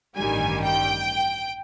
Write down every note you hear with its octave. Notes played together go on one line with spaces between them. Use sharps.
A1 G2 D#3 G3 G#5
G5